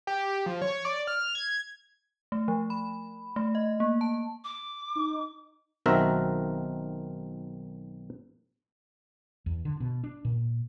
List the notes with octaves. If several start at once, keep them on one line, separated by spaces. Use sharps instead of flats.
G4
F3
C#5
D5
F6
G#6
A3
F3
B5
A3
D#5
A#3
A5
D6
D#4
B1 D#3 C4 F#4 A#4 E5
E2
D3
B2
D4
A#2